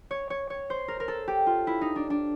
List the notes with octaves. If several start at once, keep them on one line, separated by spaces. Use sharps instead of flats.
C#5
C#5
C#5
C5
A#4
A#4
A4
G4
F4
E4
D#4
D4
D4